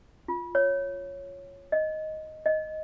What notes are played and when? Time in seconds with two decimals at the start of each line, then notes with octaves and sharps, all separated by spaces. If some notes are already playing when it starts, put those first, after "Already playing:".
0.28 F4
0.55 C#5
1.72 D#5
2.46 D#5